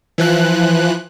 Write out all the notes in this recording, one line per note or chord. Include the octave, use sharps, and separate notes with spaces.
E3 F3 F#6